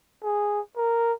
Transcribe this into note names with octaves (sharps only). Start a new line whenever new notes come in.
G#4
A#4